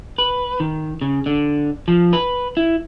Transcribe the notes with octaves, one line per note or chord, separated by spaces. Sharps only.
B4
D#3
C#3
D3
F3
B4
E4